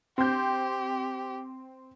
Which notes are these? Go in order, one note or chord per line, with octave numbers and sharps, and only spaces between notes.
C4 G4 G6